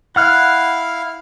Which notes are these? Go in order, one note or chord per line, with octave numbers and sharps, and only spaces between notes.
E4 F5 F#5 F6 F#6